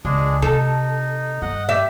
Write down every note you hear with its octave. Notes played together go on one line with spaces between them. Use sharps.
C#2 G#3 D4 G#4
C3 D#4 A4
G2 D#5 F#5
G4 E5